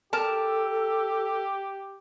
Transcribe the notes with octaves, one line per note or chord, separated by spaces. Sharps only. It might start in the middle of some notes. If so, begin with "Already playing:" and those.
G4 A4 A#4 A5